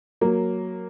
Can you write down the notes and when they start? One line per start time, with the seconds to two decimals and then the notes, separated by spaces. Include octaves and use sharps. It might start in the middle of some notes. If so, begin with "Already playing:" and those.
0.21 F#3 A#3